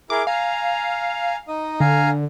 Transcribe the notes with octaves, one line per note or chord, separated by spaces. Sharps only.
E4 G#4 A#4 D6
F5 G#5 A#5
D#4 D#5
D3 F5 G#5 A#5